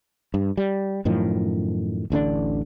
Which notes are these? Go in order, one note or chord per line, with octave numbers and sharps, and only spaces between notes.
G2
G3
F#2 A2 D#3 F3
D1 A1 D3 D4